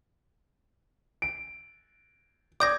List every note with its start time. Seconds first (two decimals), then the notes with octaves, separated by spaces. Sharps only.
1.22 D7
2.60 D5 D6 D#6 G6 G#6 A#6